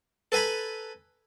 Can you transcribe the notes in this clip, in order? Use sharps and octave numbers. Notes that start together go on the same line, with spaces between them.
A4 B4 G#5 A#5 B5